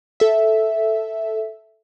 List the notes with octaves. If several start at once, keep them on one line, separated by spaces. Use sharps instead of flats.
A4 E5